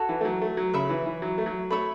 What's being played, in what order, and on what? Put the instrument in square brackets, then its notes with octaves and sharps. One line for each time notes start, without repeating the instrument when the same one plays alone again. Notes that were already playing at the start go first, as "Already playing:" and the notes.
Already playing: [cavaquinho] F#4 A4 C#5
[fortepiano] E3
A3
F#3
A3
F#3
[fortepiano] C#3 [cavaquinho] C#5 E5 B5
[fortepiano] E3
E3
F#3
A3
F#3
[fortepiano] A3 [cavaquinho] C#5 E5 B5